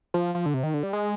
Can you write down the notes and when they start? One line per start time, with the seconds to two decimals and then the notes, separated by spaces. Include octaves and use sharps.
0.14 F3
0.35 F3
0.46 D3
0.54 C3
0.63 D#3
0.74 D3
0.83 G3
0.93 G#3